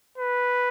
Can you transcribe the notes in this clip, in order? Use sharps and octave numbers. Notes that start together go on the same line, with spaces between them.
B4